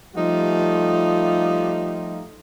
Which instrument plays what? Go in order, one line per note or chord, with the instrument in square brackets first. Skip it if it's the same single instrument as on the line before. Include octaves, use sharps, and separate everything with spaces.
[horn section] F3 G3 A3 D#4 F4 G4